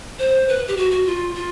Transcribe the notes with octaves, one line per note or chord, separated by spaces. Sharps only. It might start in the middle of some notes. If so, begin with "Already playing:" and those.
C5
B4
G4
F#4
F#4
F4
F4